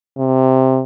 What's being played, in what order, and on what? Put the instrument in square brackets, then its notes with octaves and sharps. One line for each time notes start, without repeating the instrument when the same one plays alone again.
[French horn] C3